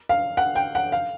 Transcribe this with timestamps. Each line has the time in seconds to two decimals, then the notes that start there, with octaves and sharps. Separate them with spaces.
0.09 F5
0.37 F#5
0.55 G5
0.75 F#5
0.92 F5